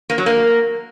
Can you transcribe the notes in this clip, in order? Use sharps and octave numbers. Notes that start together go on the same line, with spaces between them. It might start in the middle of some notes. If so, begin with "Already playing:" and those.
A#3
F#3
A#3